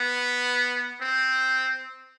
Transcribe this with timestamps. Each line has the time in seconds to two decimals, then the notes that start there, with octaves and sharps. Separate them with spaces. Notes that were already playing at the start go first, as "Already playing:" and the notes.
Already playing: B3
1.01 C4